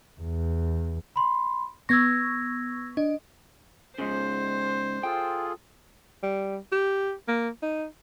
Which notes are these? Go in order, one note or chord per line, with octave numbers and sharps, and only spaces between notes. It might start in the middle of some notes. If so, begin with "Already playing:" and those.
E2
B5 C6
B3 C#6 E6 G#6 A#6
D4 D#5
G#2 C#3 C5
F4 G#4 A4 G5
G3
G4
A#3
D#4